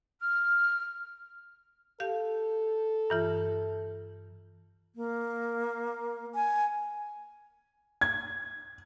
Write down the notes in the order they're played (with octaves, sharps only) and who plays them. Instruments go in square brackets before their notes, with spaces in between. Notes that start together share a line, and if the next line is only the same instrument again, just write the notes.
[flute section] F6
[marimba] G4 F5 [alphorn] A4
[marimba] G2 E3 F4
[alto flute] A#3
G#5
[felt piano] G#6